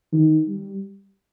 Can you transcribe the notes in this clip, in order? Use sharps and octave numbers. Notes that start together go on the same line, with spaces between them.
D#3
G3